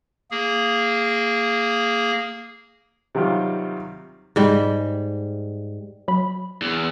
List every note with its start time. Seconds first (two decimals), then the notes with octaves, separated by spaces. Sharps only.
0.31 A#3 G#4
3.15 C3 D#3 F#3 G3 F4
4.36 G#2 G3
6.08 F#3 B5
6.62 E2